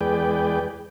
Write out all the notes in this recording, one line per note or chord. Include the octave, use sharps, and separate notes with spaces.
E2 G#3 G#4 B4 D5 G5